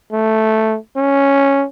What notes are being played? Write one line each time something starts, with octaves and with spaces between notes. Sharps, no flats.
A3
C#4